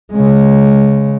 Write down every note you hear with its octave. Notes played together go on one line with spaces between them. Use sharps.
C#3 G#3